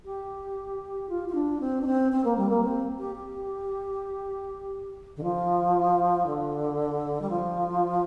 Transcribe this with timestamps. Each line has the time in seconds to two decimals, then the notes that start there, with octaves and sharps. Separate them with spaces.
0.05 G4
1.09 F4
1.28 F4
1.34 D4
1.60 C4
1.81 D4
1.86 C4
2.12 C4
2.24 A#3
2.37 G3
2.49 A#3
2.63 C4
2.98 G4
3.15 G4
5.16 D3
5.23 F3
6.26 D3
7.21 G3
7.29 F3